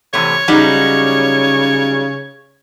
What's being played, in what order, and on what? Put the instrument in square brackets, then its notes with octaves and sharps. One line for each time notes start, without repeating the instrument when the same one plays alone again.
[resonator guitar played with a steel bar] E2 C3 A3 [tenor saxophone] C#5
[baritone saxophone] C#3 [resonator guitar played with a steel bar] F#3 G3 D#4